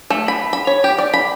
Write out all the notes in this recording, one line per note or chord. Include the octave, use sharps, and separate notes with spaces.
A3
B5
B5
C#5
G4
D5
B5